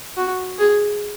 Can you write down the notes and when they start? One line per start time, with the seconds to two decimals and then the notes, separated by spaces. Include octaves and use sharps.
0.17 F#4
0.59 G#4